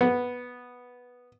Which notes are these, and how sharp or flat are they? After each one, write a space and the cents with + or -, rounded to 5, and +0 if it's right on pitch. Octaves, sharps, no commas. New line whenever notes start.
B3 -10